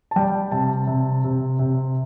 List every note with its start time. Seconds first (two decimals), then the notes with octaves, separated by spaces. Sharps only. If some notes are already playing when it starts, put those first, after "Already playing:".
0.11 A5
0.16 G3 G5
0.51 C3 A5
0.87 C3
1.24 C3
1.59 C3